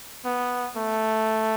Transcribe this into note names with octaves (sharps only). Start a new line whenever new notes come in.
B3
A3